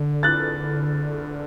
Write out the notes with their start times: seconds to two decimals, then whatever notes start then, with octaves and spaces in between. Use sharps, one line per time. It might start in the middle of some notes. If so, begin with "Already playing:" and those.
Already playing: D3
0.23 F#6 A6